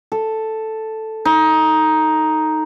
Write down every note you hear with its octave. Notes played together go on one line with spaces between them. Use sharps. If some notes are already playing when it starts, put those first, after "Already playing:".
A4
D#4